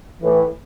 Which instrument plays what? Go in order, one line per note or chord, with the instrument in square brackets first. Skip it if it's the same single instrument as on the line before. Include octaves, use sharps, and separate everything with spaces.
[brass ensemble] A2 E3